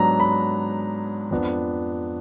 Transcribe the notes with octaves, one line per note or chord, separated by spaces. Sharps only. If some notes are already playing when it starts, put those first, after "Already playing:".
Already playing: G#2 F#3 B3 D4 A#5
B5
F2 F3 B3 D4